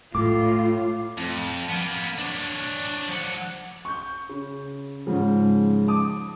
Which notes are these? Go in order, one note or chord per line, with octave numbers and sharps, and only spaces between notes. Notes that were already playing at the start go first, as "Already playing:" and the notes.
A2 F4 D6
F2
A#3 B3
D4 C#5
F3 F#5
C#6 G6
C#3
G#2 C#3 F3
A5 D6 D#6